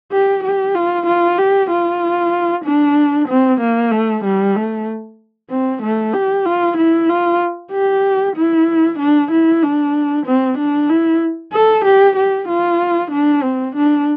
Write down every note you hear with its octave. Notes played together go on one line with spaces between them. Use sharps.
G4
G4
F4
F4
G4
F4
D4
C4
A#3
A3
G3
A3
C4
A3
G4
F4
E4
F4
G4
E4
D4
E4
D4
C4
D4
E4
A4
G4
G4
F4
D4
C4
D4